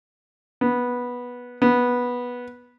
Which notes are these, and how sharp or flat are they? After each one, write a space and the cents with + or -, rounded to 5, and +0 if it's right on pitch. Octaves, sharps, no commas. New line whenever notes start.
B3 -10
B3 -10